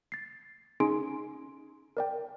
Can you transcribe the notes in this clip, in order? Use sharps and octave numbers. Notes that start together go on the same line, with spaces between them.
A6 C7
C#4 D#4 G#4 G#5 C6 D7
A#4 D5 G5